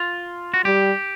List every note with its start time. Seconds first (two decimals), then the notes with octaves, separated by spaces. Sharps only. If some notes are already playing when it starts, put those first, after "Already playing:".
Already playing: F4
0.54 F#4
0.65 G3 G4